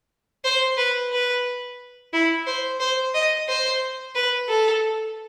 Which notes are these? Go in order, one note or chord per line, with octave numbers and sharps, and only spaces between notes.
C5
B4
B4
E4
C5
C5
D#5
C5
B4
A4